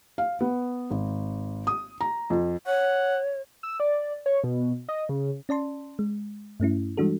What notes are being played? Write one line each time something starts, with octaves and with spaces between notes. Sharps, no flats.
F5
B3
G#1
D#6
A#5
F2
C#5 F#5
E6
D5
C#5
B2
D#5
C#3
C#4 D5 A5 C6
G#3
G2 A3 C#4 E4
E3 G3 G#3 D4 F#4 A4